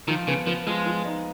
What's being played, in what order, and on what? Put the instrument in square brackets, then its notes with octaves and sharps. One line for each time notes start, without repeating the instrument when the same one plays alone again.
[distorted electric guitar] D#3 [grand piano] F3
[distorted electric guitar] C#3 [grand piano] B3
[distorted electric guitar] F3 [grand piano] B3
[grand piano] F3 [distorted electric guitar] G#3
[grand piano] F3
D#4